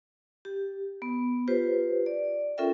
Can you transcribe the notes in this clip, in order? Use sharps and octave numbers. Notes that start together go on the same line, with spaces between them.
G4
B3
F4 G4 B4 C5
D5
C#4 F4 A4 A#4 E5 G5